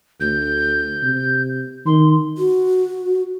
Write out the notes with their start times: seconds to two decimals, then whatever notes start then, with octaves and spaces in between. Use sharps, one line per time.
0.20 D2 G6
1.03 C3
1.86 D#3 C6
2.38 F#4